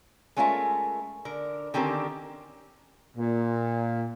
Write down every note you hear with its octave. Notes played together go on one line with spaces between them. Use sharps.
G#3 A3 C#4 F4 A#4 E5
D3 A#4
D3 D#3 C4 C#4 G4 A#4
A#2